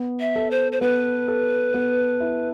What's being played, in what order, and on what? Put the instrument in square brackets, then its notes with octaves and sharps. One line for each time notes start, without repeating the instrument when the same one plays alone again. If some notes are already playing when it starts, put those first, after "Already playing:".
Already playing: [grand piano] B3
[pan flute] E5
[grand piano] A4
[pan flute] C5
C5
[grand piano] B3 [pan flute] B4
[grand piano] A4
B3
E4